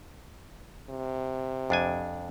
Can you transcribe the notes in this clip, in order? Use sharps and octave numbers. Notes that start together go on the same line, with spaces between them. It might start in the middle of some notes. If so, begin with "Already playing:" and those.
C3
F2 D4 G#5